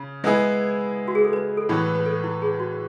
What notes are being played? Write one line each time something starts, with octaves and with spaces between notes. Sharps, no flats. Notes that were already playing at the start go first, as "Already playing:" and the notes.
Already playing: C#3
G#3 B3 E4 G#4 B4
F#4
G#4
A4
B4
A4
A2 E3 B3 B4
B4
A4
E4
G#4
F#4